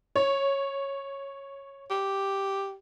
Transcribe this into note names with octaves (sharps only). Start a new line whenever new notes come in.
C#5
G4